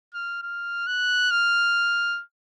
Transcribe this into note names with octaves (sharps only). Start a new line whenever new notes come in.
F6
F6
F#6
F6